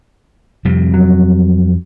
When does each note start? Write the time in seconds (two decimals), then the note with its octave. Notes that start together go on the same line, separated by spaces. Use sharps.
0.65 F2 C3 G3
0.94 F#3